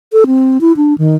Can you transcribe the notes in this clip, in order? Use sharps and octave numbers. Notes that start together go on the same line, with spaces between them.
A4
C4
E4
D4
D#3